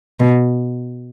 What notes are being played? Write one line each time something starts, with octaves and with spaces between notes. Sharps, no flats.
B2